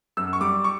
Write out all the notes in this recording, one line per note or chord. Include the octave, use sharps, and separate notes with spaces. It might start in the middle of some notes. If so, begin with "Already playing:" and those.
F#2 E6
C#6
G3 D6
C#6